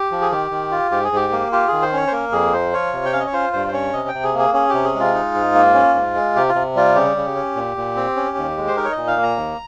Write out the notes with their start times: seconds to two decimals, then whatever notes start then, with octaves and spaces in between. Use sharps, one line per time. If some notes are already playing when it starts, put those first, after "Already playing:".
Already playing: G4
0.11 F3
0.21 G#4
0.31 D#3 G4
0.51 D#3
0.71 F4
0.91 G#2 G4
1.04 G#4
1.12 G#2 G4
1.32 A#3
1.52 F4 G4
1.68 D#3 G#4
1.82 C5
1.93 C#4 C#5
2.07 C5
2.12 A#3 A#4
2.32 F2 G#4
2.53 F3 C5
2.73 F4 C#5
2.93 C3
3.05 G5
3.13 C#4 F5
3.20 D#5
3.27 C#5
3.33 F4 C5
3.53 G2 C5
3.68 C5
3.73 C#4 C#5
3.93 C3 D#5
4.08 G5
4.14 C3
4.23 G#4
4.34 A#3
4.39 G#4
4.53 C#4 G#4
4.70 C3 G4
4.84 G#4
4.94 G#3
5.00 F4
5.14 D#4
5.34 G#2
5.55 A#3
5.74 C#4
5.94 G#2
6.15 G#3
6.35 C3 G4
6.49 F4
6.55 C3
6.76 G3 F4
6.95 C#3 G4
7.16 C#3
7.35 C#4
7.55 A#2
7.77 A#2
7.96 C4
8.16 C#4
8.37 D#2
8.57 G#3
8.68 C5
8.77 D#4 A#4
8.85 C#5
8.92 D#5
8.97 A#2
9.07 F5
9.17 A#3
9.23 A#5
9.37 D#2